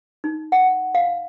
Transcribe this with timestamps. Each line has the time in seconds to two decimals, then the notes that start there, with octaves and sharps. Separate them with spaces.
0.24 D#4
0.52 F#5
0.95 F5